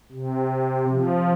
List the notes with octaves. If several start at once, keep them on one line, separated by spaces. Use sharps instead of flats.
C3
F3